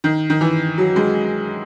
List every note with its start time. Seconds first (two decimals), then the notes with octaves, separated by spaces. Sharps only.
0.04 D#3
0.30 D#3
0.41 E3
0.78 F#3
0.96 G#3